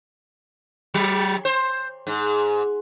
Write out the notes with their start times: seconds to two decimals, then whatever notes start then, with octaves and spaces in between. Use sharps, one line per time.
0.94 F#3
1.45 C5
2.07 G#2